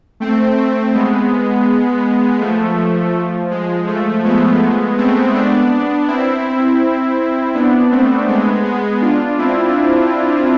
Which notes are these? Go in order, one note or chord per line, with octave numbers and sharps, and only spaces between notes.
A3 C4
A3 C4
G#3 B3
F3 A3
F3
G#3
F3 A3
G#3 B3
A3 C4
B3 D4
C4 E4
B3 D4
A3 C4
G#3 B3
G#3 B3
D4 F4
C4 E4